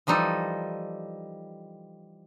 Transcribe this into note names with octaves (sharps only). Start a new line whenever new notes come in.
E3 F3 G3 D#4 A4